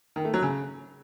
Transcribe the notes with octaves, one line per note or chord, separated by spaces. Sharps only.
D#3
A3
F#3
C#3